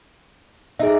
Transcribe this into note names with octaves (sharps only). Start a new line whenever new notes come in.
D#4 G#4 E5